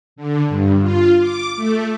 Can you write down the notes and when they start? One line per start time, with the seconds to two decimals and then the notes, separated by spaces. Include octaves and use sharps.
0.16 D3
0.49 G2
0.81 F4
1.20 D6
1.56 A3